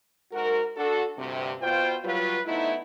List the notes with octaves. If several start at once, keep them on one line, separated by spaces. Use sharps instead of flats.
G#2 F#4 A#4
D4 F#4 A4
D2 G2 C3
B2 F4 C5 G5
F#3 G3 F4 B4
F3 A3 B3 D#4 E4